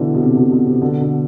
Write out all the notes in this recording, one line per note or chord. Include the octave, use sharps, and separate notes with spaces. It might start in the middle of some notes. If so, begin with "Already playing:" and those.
Already playing: B2 D3 E3
B2
C3
B2
B2
C3
B2 D3
B2 D3